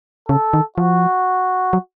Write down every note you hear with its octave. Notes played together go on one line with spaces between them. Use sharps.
C#3 A4
D#3
F3 F#4
F#3